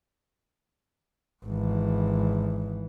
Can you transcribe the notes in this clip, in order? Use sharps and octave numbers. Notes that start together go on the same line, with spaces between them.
G#1 E3